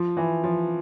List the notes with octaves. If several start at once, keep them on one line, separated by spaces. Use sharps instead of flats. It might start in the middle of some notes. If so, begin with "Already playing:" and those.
Already playing: F3
E3
F3